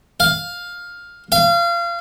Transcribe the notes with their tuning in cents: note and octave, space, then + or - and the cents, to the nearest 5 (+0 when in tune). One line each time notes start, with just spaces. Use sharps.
F5 +10
F5 -30